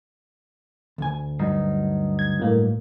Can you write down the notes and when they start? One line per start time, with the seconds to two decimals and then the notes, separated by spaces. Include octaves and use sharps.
0.98 D2 G#5
1.40 G2 F#3 D#4
2.19 G#6
2.39 A2 A#3